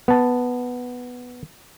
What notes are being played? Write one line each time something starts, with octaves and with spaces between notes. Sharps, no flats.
B3 A5